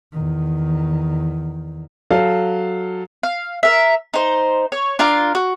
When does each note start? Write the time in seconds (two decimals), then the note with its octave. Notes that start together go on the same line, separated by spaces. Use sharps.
0.13 E2 D#3
2.10 F#3 A4 F5
3.23 F5
3.63 A#4 E5
4.14 D#4 C5
4.72 C#5
4.99 D4 F4 A#4 F5
5.35 F#4